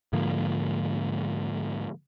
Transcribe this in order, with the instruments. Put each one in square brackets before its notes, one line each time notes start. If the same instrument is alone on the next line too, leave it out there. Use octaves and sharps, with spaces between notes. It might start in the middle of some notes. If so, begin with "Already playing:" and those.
[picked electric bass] G#2 D3 F3 A#3